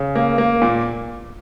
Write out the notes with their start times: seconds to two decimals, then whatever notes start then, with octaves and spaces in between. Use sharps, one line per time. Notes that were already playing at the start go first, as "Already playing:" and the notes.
Already playing: C#3
0.15 A#3
0.38 A#3
0.62 A#2